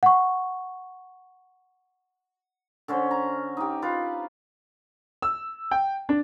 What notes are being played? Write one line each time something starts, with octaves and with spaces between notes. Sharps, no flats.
F#5 C#6
D3 C#4 C5
A#5
D#4 G4
F4 B4
E6
G5
D4